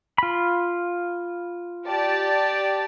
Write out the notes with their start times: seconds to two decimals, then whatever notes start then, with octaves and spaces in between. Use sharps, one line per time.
0.18 F4 B5
1.87 G4 D5 A5